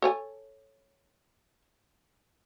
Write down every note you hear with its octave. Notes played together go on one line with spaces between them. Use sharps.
A4 C#5 G#5